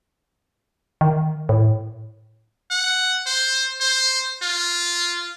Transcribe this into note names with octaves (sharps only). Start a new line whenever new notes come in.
D#3
A2
F#5
C5
C5
F4